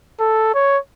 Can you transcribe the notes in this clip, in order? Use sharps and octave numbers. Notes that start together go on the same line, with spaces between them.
A4
C#5